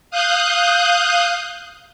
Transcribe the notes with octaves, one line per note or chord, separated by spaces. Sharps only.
F5 D#6 F#6 G6